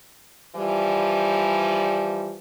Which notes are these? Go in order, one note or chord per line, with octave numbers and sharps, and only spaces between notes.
E3 F3 G3